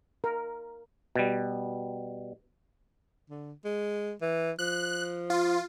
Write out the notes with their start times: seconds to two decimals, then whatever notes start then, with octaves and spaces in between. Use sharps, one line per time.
0.24 A#4
1.16 B2 G3
3.30 D3
3.65 G#3
4.22 E3
4.59 F3 F#6
5.30 F4